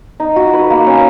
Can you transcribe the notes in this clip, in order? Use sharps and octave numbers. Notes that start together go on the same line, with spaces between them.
D#4
F#4
B4
A#3
C#4